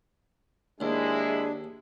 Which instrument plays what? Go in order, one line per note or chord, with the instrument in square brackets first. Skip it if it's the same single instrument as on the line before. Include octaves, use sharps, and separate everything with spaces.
[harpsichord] D#2 [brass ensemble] G#3 E4 [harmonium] D4 [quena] G#4